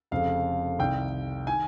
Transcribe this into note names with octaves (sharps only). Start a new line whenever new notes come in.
F1 F2 C#3 F3 F5
C2 C3 D#3 G5
D#3 G#5